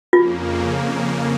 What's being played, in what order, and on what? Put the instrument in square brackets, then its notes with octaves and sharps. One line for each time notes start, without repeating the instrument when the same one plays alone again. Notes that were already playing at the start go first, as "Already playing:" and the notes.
[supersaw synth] F2 C#3 A#3 [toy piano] F4